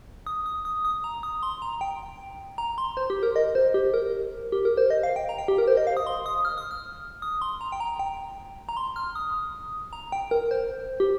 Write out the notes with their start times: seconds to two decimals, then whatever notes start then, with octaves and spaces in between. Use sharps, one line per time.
0.27 D#6
0.46 D#6
0.65 D#6
0.85 D#6
1.04 A#5
1.23 D#6
1.43 C6
1.62 A#5
1.81 G5
2.58 A#5
2.78 C6
2.97 C5
3.10 G4
3.23 A#4
3.36 D#5
3.55 C5
3.74 G4
3.94 A#4
4.52 G4
4.65 A#4
4.77 C5
4.90 D#5
5.03 F5
5.16 G5
5.29 A#5
5.38 G5
5.48 G4
5.58 A#4
5.68 C5
5.77 D#5
5.87 F5
5.97 D#6
6.07 C6
6.26 D#6
6.45 F6
6.58 D#6
6.71 F6
7.22 D#6
7.42 C6
7.61 A#5
7.72 G5
7.80 A#5
7.99 G5
8.69 A#5
8.77 C6
8.96 F6
9.15 D#6
9.93 A#5
10.12 G5
10.31 A#4
10.51 C5
11.00 G4